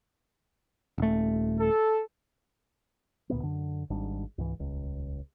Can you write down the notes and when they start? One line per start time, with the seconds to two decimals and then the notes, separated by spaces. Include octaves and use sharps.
0.98 D#1 A3
1.60 A4
3.30 D2 A#2 A3 B3
3.43 F#2 D3
3.90 G#1 G#2 G3 D4
4.38 C#2 G#2 E3
4.59 D#1 C#2